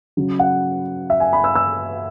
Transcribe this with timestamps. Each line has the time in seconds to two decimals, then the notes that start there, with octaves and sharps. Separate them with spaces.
0.17 C#3 F#3
0.39 F#5
1.10 E5
1.20 G#5
1.33 B5
1.44 E6
1.55 E6